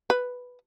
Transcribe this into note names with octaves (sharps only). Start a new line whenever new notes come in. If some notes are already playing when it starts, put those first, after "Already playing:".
B4